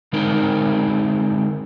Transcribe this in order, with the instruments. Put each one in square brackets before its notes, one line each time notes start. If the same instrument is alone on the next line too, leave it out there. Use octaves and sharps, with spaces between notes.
[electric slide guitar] D3 G#3 C4 D#4 A#4